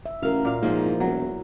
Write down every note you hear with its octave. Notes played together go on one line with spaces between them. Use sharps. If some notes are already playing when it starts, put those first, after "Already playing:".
E5
A1 F#4 A#4 F5
A#2 F5
G#2 F3 A#3
E4
E1 F#3